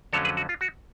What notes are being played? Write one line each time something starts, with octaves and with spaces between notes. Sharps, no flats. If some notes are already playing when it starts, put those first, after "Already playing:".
F2 D3 F#3 A3 C#4 A4 C#5
G#4 B4
F#4
F4
F#4